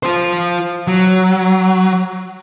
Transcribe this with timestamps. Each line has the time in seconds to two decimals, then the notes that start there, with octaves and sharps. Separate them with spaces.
0.03 F4 C5
0.87 F#3